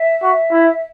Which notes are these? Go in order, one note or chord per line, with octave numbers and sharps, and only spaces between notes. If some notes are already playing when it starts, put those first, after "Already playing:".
Already playing: E5
F#4
E4